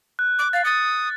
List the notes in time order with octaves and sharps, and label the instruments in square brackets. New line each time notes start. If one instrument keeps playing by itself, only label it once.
[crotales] F#6
[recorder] D6
[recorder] F5 [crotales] A6
[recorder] D#6 [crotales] A6 C#7